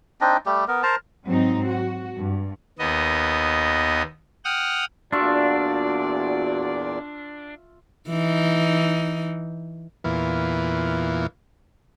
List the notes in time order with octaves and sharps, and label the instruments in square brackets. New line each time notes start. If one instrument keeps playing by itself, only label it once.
[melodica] C4 D4 D#4 D#5
G3 A3 G4
B3 A#4
A#4 C5 A5 A#5
[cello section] G#2 F#3 C4 D#4
F#4
G2
[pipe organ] D#2 B3 D#5
F#5 G5 D#6 F6
[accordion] E2 A#2 D5 [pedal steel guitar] D4 [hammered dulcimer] F4 E5 C#6 [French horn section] F#4
[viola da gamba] E3 D#4
[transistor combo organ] E2 A#2 E3 B3 F4